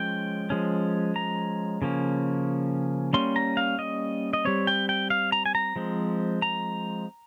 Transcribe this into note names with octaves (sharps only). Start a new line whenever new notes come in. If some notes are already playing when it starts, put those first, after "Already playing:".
Already playing: F3 G#3 C#4 G5
F3 G#3 C#4
A#5
C#3 F3 A#3 C#4
G3 A#3 C#4 C6
A#5
F5
D#5
D#5
G3 C4 C#5
G5
G5
F5
A#5
G#5
A#5
F3 G#3 C4
A#5